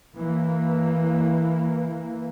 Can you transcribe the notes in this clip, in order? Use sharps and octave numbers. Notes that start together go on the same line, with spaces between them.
E3 A#3